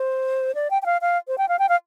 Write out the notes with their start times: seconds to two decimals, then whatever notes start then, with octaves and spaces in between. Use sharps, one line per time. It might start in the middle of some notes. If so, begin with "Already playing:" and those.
Already playing: C5
0.55 D5
0.70 G5
0.82 G5
0.86 F5
1.01 F5
1.28 C5
1.38 G5
1.48 F5
1.59 G5
1.69 F5